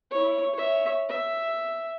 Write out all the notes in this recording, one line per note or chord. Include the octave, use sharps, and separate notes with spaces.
E4 C#5
C#5 E5
E5